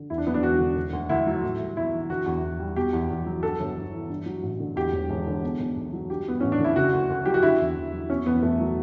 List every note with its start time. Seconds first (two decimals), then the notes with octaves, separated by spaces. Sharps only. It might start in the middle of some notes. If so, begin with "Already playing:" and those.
Already playing: D3
0.10 E2 E4
0.18 D4
0.27 F#3 B3
0.34 D4
0.43 E1 F#4
0.59 D3
0.76 D3
0.93 D2
1.09 D2 E4
1.27 F#3
1.43 A2
1.60 G3
1.77 B1 E4
1.93 E3
2.10 D3 F#4
2.26 E2
2.43 E2
2.60 G3
2.76 B2 G4
2.93 E2
3.10 E2
3.26 F#3
3.43 G2 A4
3.60 G1
3.76 G1
3.93 E3
4.10 G2
4.26 F#3
4.43 A1
4.60 D3
4.76 E2 G4
4.93 E1
5.10 E1
5.27 D3
5.43 B2
5.60 B1
5.76 B1
5.93 F#3
6.10 G2 G4
6.26 G3 B3
6.41 A1 C#4
6.52 D4
6.60 D3 E4
6.76 C#3 F#4
6.93 D2
7.10 D2
7.26 F#3 G4
7.34 F#4
7.43 D3 E4
7.60 E2
7.76 E2
7.93 F#3
8.10 B2 C#4
8.26 E2 B3
8.43 E2 A3
8.60 F#3